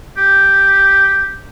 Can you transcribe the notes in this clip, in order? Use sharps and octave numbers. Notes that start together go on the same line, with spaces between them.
G4